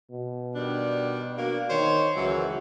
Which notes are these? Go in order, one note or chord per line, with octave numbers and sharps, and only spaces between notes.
B2
D#3 G3 D4
F#3 A#3 D4
D#3 C5 C#5
C#2 F#2 E3 F#3